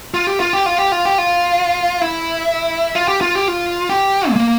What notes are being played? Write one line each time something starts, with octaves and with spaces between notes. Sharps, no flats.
F4
G4
F4
G4
F4
G4
F4
G4
F4
E4
F4
G4
F4
G4
F4
G4
G#3
A#3